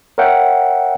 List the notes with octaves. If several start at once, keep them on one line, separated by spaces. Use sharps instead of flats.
A#4 C#5 E5 F#5 G5